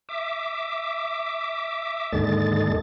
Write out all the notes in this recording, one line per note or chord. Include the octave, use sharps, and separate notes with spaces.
E5 D6
D#2 G#2 D3 G#3 A6